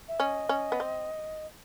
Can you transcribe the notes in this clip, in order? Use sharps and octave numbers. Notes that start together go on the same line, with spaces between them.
E5
C#4 D#5
C#4
B3
C4